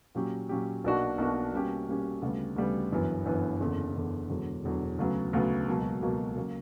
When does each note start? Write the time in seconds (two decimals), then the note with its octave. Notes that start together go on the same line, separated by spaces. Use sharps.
0.15 A#2 F#3 C#4 G4
0.49 A#2 F#3 C#4 G4
0.84 B1 B2 A#3 D4 F#4
1.18 B1 B2 A#3 D4 F#4
1.53 B2 G3 A#3 C#4 G4
1.87 B2 G3 A#3 C#4 G4
2.22 D2 C#3 G3 B3
2.56 D2 C#3 G3 B3
2.92 G1 F#2 E3 B3
3.25 G1 F#2 E3 B3
3.60 F#1 E2 D3
3.95 F#1 E2 D3
4.29 E1 E2 D3 F#3
4.64 E1 E2 D3 F#3
4.99 D2 C#3 F#3 B3
5.33 D2 C#3 F#3 B3
5.67 C#2 B2 F#3 A#3
6.02 C#2 B2 F#3 A#3
6.37 C#3 F#3 A#3